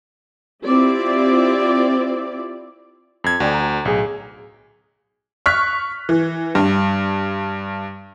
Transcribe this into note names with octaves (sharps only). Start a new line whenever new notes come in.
C4 E4 F4 G4 D5
F2 G#6
D2 F#4 D5 G5
A#5
B1 A2 G#4
C#6 F6 F#6 B6
E3
G2